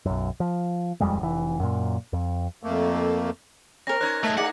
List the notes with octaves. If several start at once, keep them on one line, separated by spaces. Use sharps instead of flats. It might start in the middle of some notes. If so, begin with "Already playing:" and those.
B1 F#2
F3
D#1 F2 G3 G#3
F1 E3
F#2 A#2
F2
F2 A3 A#3
C4 A#4 B4 A#6
C#4 D#4 C5 F#6 G#6
A3 G#4 E5
A3 D#4 E4 G#4 D5 F#5